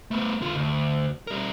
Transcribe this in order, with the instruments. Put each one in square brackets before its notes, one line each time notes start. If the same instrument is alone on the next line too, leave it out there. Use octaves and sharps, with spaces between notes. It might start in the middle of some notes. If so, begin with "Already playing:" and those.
[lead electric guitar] A3 B3
D3 F4
D2
G3 A#4